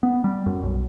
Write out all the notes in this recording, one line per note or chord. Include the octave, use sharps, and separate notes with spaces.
B3
G3
F#2
B1